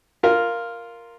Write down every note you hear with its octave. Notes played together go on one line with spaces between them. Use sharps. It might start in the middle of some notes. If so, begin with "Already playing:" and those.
F4 A#4